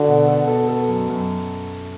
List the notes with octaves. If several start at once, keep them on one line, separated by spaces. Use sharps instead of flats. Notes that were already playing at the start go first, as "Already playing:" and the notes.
Already playing: D3 F#4
B2
A4
B2 A4
A4
F#2
F#2